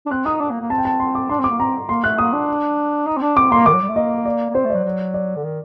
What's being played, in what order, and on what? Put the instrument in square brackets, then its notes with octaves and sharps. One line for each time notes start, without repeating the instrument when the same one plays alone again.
[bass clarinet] D4
[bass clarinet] C4 [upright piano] F#6
[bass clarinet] D#4 [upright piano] D#6
[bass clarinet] D4
A#3
A#3
[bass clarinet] C4 [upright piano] A5
[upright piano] G5
A5
C6
D6
[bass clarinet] D4 [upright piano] C6
[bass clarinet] C4 [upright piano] D6
[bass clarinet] A#3
[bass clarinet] C4 [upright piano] A#5
[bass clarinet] A#3 [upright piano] C6
[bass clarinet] A3 [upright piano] F#6
[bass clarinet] A#3 [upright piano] D#6
[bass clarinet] D4
D#4
C4
D4
[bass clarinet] C4 [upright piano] D6
[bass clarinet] A#3 [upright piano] C6
[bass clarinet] D#3 [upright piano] D6
[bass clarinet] F#3
G3
A3
[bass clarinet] A#3 [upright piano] D#5
[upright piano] D5
[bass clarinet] A#3
[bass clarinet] C4 [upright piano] C5
[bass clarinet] A3
[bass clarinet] F#3 [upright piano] D5
[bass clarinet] F#3
[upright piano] D5
[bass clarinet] D3
D#3